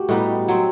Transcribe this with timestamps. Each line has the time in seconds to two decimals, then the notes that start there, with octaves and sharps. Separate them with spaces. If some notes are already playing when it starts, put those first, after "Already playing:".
Already playing: A3 F#4 G4
0.09 A2 G3 B3 D#4 D#5
0.48 F#3 C4